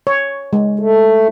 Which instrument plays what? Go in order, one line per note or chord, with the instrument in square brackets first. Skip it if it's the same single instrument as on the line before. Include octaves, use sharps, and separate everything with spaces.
[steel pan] C#5
G#3
[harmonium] A3